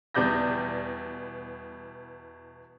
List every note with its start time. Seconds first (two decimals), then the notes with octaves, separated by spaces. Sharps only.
0.14 E2 B2 G3 D5 G6 A#6